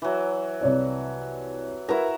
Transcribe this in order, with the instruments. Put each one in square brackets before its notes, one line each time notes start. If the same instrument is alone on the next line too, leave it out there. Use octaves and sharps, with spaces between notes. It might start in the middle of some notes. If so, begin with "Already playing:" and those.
[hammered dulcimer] E3 F#3
[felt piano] C2 C#5 D5
[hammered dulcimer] E4 F#4 A#5 [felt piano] A#4 B4